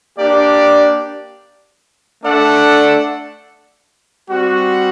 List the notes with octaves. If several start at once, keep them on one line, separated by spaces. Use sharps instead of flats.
A#3 D4 G4 D5
A3 D4 A4 D5 F#5
G3 C4 F#4